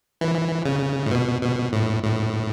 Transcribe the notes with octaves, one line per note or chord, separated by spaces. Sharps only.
E3
C#3
A2
B2
B2
A2
A2